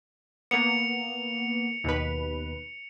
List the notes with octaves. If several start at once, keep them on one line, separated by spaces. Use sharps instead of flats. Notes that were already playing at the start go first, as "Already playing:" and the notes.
A#3 B3 C#7 F7
D#2 B2 B4